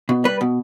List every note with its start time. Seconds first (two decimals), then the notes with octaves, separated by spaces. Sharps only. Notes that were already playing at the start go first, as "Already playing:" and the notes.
0.09 B2
0.24 G3 B4
0.41 B2